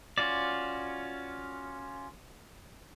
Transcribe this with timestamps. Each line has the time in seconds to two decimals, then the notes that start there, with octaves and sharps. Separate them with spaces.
0.18 C#4 F4 F#4 D5